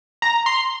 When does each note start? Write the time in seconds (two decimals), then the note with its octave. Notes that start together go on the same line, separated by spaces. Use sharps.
0.22 A#5
0.46 C6